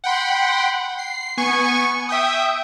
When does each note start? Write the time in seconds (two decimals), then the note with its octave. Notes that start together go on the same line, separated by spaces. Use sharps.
0.04 F#5 G5 B5 C6
0.99 C7
1.37 B3 G#5 C#6 C#7
2.09 E5 G5 D#6